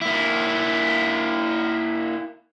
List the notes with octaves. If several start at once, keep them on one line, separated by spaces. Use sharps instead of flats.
A#3 E4